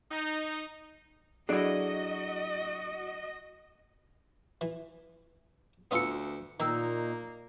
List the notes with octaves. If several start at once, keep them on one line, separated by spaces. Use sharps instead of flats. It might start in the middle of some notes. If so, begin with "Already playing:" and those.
D#4
F#3 D4 E4 F#4 G#4 A4 D5 D#5
E3
D2 B3 C#4 F4 D#6 E6 C#7
A#2 D#3 A#3 D#4 A#5 E6